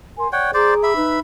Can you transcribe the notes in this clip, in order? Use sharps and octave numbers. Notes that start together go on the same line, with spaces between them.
A#4 G#5 C6
C#5 D5 F#5 G5
G#4 C5 D5 A#5 D6
E5 B5
D#4 B4